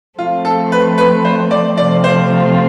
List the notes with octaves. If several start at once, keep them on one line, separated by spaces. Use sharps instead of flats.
F3 A3 C4 F4
A4
B4
B4
C5
D5
C3 F3 A3 C4 F4 D5
C5